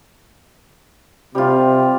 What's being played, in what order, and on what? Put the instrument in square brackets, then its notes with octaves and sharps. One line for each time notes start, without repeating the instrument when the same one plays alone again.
[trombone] C3 [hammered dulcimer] G3 F4